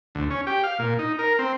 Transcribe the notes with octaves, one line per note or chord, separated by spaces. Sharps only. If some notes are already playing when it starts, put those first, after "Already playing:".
D2
C#4
G4
F5
A#2
D#4
A#4
C4